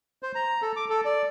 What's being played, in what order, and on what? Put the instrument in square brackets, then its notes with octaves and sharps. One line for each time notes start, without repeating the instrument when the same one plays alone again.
[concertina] C5
A#5
A4
D6
A4
D5